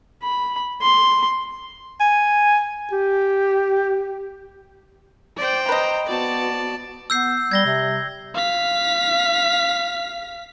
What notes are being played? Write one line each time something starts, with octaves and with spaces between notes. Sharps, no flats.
B5
C6
G#5
G4
C5 D5 G5
B4 D#5 A#5
B3 F#4 D5 A5
B3 E6 G6 C7
G3 G#6 A#6 G7
C3
F5 B6